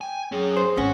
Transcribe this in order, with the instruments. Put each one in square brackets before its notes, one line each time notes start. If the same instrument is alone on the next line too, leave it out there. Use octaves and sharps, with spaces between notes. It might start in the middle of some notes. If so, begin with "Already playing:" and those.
[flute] G5 [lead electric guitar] G#5
[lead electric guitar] F#2 C#4 [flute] G#4
[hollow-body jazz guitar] C5
[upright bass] G#1 [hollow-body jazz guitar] C#4 [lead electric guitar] F#4 F#5